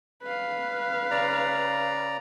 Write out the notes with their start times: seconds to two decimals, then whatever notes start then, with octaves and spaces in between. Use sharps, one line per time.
0.23 B4 F5
1.11 C#3 D5 A#5